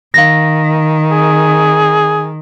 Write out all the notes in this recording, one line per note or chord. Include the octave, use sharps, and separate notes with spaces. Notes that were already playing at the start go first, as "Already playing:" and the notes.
D#3 F5 A#6
G#4